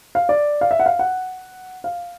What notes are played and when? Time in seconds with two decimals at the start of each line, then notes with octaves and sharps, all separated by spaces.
0.15 F5
0.29 D5
0.61 F5
0.71 E5
0.80 F#5
0.86 F5
0.99 F#5
1.84 F5